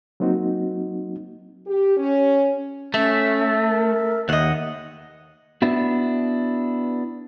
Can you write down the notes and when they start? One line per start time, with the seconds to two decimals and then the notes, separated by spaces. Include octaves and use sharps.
0.20 F#3 A#3 C4 D#4 F#4
1.66 G4
1.97 C#4
2.94 A3 C#4 E5
3.68 A#4
4.29 D#2 D#5 E5 F#5
5.62 B3 D4 E4 F#4